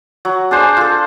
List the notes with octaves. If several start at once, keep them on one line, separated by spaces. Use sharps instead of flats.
F#3
D4 G#4 C5
F4 A4